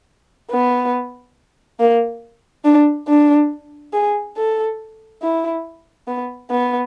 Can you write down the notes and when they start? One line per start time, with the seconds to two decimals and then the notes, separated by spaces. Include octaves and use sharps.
0.51 B3
1.80 A#3
2.65 D4
3.08 D4
3.93 G#4
4.37 A4
5.22 E4
6.07 B3
6.50 B3